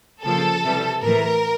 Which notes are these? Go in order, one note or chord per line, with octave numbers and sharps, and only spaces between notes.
C#3 F3 A#3 A4
C3 E3 G3
A2 E3 A3 A#4